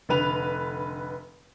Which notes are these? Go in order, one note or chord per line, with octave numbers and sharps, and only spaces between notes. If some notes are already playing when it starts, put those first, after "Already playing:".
F1 D3 B4 F7